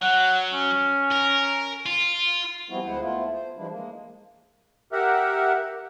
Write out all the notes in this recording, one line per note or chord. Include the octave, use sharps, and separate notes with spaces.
F#3 F#5
C#4
A#4
F4
F3 G3 B3 C4 E4 F#4
D2 G#3 E4 C5 F#5
A3 B3 E4 F4
C5
E3 F3 G3 G#3 D4 E4
G#3 A#3
G4 A#4 E5 F#5